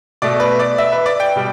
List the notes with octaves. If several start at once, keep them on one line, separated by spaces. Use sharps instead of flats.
B2 A3 D5
B4
D5
E5
B4
D5
G5
B2 G3